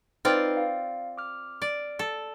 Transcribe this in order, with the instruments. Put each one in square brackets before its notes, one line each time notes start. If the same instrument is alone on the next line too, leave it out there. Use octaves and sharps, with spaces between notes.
[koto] C4 F4 D5 [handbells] D#4 B4
[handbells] F5
D6 F6
[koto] D5
A4